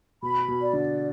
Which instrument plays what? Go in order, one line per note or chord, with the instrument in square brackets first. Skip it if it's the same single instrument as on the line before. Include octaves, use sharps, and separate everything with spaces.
[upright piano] B2 [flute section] B5
[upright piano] B2
[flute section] D5
[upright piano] D3